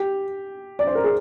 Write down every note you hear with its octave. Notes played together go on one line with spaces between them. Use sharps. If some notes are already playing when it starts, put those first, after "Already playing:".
Already playing: G4
D5
C5
A#4
G#4